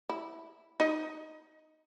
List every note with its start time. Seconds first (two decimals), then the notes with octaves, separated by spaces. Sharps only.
0.09 E4
0.80 D#4 D#5